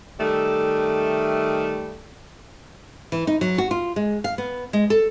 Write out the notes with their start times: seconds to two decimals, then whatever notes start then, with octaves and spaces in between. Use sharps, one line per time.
0.19 D#3 G3 A3
3.12 E3
3.27 D#4
3.41 F#3
3.58 F#4
3.71 F4
3.96 G#3
4.24 F5
4.38 B3
4.73 G#3
4.90 A4